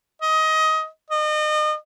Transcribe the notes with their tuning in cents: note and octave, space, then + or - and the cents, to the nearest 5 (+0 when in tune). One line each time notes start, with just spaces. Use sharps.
D#5 +20
D#5 -35